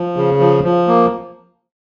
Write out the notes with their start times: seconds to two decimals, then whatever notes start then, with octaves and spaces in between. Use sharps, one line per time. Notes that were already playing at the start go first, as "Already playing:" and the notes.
Already playing: F3
0.17 C#3
0.40 F3
0.64 F3
0.88 A#3